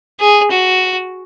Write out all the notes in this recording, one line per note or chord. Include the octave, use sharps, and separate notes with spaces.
G#4
F#4